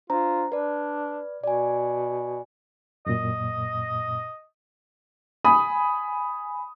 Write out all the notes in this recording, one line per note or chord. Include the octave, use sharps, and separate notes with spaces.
D4 F4 C5 A#5
D4 B4 D5
B2 D5 G#5
F#2 A#2 D#5
G#5 B5 D#6